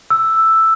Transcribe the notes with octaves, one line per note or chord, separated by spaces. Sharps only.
E6